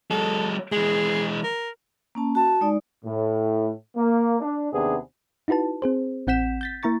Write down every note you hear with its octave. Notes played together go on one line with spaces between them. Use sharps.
F#3 G#3 A4
E3 G#3 G#4
A#4
A#3 C#4 A5
F#4 A5
G#3 D#4 D5
A2
A#3
D4
D#2 C3 B3 D4 G#4
D#4 E4 F#4 B4 A5
C4 G#4 C5
A1 C4 F#5 G6 B6 E7
G6 A6 B6
A#3 E4 A#5 C#6 A6